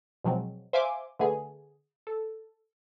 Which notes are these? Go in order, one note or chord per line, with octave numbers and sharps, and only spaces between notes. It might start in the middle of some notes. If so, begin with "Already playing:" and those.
B2 F3 F#3 G#3 C4
C5 E5 F5 G#5 C6 D6
D3 A3 B3 G#4
A4